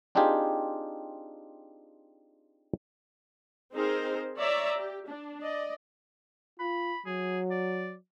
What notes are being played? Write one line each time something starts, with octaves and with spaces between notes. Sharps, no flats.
C4 D4 D#4 F4 G4 G#4
C4 D#4 G#4 A#4 C5
C#5 D5 E5 A#5
G4
D4
D5 D#5
F4 B5
F#3 G#4
D5